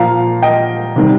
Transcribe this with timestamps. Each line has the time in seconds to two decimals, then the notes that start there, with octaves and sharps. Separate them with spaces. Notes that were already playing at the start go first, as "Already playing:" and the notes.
Already playing: A#2 F3 F5 A#5
0.42 D#5 G5
0.96 C3 D#3 G3